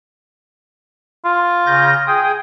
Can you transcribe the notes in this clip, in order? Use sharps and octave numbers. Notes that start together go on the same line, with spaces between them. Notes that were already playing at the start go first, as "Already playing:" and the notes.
F4
C#3 G6 A#6
G#4 G5 D#6